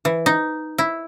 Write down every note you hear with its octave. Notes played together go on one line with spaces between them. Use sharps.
E3
D#4
E4